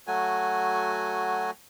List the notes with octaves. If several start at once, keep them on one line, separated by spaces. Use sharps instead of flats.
F#3 A3 F#4 G#5